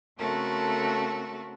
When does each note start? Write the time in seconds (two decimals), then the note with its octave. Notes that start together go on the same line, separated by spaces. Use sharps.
0.18 C#3 A3 C4 F#4 A4 A#4